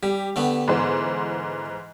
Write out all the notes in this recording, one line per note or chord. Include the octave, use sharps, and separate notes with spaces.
G3 G4
D3 A3 B3
G#2 E3 C5